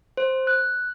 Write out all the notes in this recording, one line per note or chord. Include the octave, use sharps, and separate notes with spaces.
C5
F#6